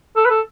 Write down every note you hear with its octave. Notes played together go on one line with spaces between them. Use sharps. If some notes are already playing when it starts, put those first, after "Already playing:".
A4
B4
A4